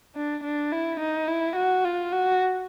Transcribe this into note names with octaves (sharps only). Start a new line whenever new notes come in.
D4
D4
E4
D#4
E4
F#4
F4
F#4